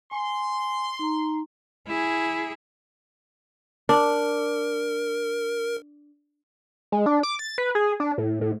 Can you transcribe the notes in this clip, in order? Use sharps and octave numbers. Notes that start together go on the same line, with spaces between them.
G#5 C6
D#4 A#5
E4 G#4
D4 A#4
G#3
D4
D6
A6
B4
G#4
D4
A2
A2